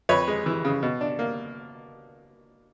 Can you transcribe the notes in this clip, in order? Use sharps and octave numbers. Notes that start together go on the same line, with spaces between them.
F2 B4 C#5
G#3
E3
C#3
B2
D4
A#3